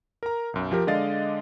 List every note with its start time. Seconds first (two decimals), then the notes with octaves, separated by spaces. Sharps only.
0.23 A#4 A#5
0.54 B1 F#2
0.71 F3 G4 A#4
0.87 D3 G#3 D5 D#5 F5 A6